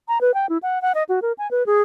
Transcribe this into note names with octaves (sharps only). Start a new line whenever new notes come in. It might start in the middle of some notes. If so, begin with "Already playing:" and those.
A#5
B4
G5
E4
F#5
F#5
D#5
F#4
A#4
G#5
B4
G#4